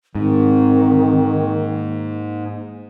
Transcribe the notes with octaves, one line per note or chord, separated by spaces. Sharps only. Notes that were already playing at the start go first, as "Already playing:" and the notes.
G#2 D#3 C4
A#3